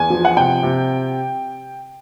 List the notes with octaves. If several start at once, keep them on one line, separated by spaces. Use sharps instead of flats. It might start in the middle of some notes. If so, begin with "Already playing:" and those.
Already playing: E2 G#5
F3
F#5
C3 G5
C3